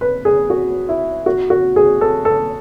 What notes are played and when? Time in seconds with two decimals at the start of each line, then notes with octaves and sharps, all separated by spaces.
0.01 B4
0.25 G#4
0.50 F#4
0.89 E4
1.26 F#4
1.50 F#4
1.76 G#4
2.01 A4
2.25 A4